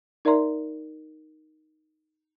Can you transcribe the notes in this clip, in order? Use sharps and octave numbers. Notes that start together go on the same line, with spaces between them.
D#4 A#4 D5 E5 A#5 C6